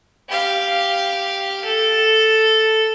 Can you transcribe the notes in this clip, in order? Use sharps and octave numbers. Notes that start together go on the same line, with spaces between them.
G4 F5
A4